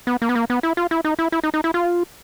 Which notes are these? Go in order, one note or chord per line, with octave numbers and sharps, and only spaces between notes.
B3
A#3
B3
A#3
B3
E4
F4
E4
D#4
E4
E4
D#4
D#4
E4
F4